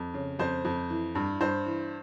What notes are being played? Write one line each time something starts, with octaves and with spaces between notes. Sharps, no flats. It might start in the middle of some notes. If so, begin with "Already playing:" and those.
Already playing: F2
C#3
F2 C5
F2
E3
G2
G2 C5
E3